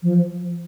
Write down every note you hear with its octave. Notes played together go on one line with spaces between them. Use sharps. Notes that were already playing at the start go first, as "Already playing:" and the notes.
F3